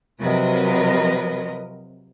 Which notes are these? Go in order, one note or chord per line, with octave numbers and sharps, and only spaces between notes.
C3 F3 F#3 A#4 B4 D#5